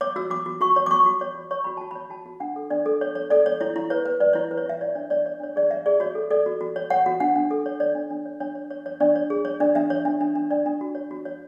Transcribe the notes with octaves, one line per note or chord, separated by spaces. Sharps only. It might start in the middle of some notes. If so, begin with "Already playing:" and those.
C#5 D6
F#4 E6
F#4 D6
F#4
F#4 C#6
C#5
D6
F#4 C#6
F#4
C#5
F#4
C#5 C#6
F#4 B5
F#4 A5
B5
C#5
F#4 A5
F#4
D4 F#5
A4
D4 D5
A4
C#5
C#5
A4 D5
C#5
E4 C#5
E4
B4 C#5
B4
B4 D5
E4 C#5
B4
C#5
E4 E5
C#5 D5
D4 C#5
C#5 D5
C#5
D4 C#5
G#4 D5
C#5 E5
G#4 D5
F#4 C#5
A4
A4 D5
F#4
F#4
C#5
C#5 F#5
F#4
D4 F#5
D4
A4
C#5
C#5 D5
D4
D4
C#5
D4 C#5
C#5
C#5
C#5
D4 D5
C#5
G#4
C#5
D4 D5
D4 E5
C#5
D4
D4
D4
D4 D5
D4
F#4
C#5
F#4
C#5